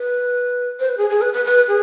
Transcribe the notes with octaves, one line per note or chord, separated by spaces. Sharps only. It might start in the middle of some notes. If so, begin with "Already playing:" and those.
Already playing: B4
C5
B4
G#4
G#4
B4
B4
B4
G#4